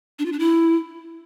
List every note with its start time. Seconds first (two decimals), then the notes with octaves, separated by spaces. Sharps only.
0.19 D4
0.26 F4
0.32 D4
0.39 E4